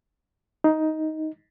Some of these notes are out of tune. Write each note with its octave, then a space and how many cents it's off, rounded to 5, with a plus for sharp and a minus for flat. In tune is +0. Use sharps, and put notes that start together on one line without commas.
D#4 +10